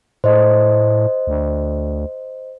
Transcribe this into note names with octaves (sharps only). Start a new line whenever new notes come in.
A2 C5 D#5
D2